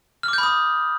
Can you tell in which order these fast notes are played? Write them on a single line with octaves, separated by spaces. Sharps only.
F6 D6 G6 B5 D#6